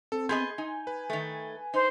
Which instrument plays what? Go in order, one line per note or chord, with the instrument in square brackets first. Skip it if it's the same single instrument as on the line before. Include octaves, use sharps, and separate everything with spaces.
[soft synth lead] C4 [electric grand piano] A4
[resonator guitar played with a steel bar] B3 G#4 D#5 [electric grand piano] C6 G6 G#6
[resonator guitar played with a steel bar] D#4 [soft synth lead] G#5
[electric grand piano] B4
[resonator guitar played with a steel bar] D#3 A3
[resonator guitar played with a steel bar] D#4 [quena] C5